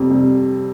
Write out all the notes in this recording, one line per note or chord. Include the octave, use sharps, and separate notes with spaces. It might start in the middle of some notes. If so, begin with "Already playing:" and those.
Already playing: F2 C3 G3
C3 G3